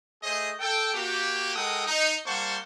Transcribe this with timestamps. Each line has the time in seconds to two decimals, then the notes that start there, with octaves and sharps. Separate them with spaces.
0.23 A3 G#4 C5 D#5
0.59 A4 G5
0.93 A#3 F#4 G4
1.54 G#3 A4 A#4 F#5 G5 D#6
1.86 D#4
2.26 G3 A#3 C5 F#5 A5 C#6